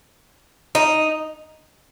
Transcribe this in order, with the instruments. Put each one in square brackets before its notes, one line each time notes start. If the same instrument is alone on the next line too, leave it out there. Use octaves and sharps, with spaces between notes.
[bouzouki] D#4